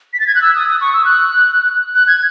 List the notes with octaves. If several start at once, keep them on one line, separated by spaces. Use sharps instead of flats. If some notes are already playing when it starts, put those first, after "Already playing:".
B6
A6
G#6
F#6
E6
D#6
D#6
C#6
E6
F#6
F#6
G#6